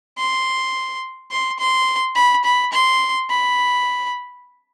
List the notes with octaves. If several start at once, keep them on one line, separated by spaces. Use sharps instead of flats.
C6
C6
C6
B5
B5
C6
B5